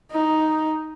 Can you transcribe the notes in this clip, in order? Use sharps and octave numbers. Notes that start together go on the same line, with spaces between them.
D#4